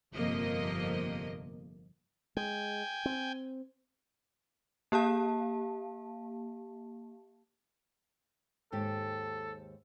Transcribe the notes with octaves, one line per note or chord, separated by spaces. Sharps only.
G1 F2 C3 F3 A#3 D#5
G#3 G5 G#5
C4
A#3 G4 F5 A5
D#2 G#2 G4 A4